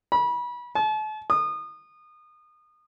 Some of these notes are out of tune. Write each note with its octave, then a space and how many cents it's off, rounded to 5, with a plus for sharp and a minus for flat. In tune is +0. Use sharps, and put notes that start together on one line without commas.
B5 -30
A5 -40
D#6 -30